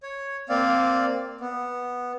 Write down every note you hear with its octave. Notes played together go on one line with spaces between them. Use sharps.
C#5
A#3 C4 D5 F5
B3